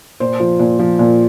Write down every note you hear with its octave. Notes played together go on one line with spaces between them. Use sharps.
A#2 C5
F3
A#2
F3
A#2